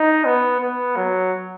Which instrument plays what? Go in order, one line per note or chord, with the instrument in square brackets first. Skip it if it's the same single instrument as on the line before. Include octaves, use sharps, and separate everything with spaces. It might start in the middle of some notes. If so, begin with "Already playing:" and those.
Already playing: [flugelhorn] D#4
B3
B3
F#3